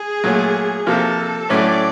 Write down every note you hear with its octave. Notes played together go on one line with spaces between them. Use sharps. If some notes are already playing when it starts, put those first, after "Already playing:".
Already playing: G#4
A#2 F#3 A3
C3 F3 A#3 A4
A2 F#3 A3 C#4 D5